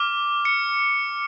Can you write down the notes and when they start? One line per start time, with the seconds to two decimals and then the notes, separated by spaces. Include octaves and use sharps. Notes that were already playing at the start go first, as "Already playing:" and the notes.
Already playing: D6 F6
0.45 C#7